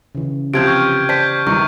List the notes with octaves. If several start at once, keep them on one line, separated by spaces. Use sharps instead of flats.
C#3 E3
C3 F3 B3 C4 G4 G6 G#6 D7
C#6 F6
C5 D5 A5 G6 B6
E2 C3 D#3 G3 D#4 E4 C#6